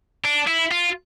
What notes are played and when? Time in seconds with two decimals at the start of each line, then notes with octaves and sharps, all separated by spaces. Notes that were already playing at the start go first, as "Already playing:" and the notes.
0.24 D4
0.47 E4
0.71 F4